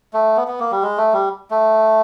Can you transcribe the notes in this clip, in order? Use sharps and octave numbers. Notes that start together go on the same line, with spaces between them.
A3
B3
B3
A#3
G3
G#3
A3
G3
A3